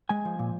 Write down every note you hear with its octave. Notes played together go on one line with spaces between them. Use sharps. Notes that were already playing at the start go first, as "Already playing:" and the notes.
G#3 G#5
F3
A#2